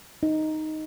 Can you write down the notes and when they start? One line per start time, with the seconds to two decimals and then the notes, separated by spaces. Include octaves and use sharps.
0.23 D#4